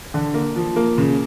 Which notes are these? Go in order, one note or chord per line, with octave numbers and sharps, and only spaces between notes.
D3
A#3
F3
A#3
C#3